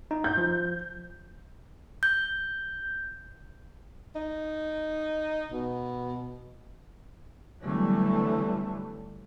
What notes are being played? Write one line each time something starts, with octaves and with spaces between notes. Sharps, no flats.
D#4
G6
F3
G6
D#4
B2
D3 E3 F#3 G3 A3 B3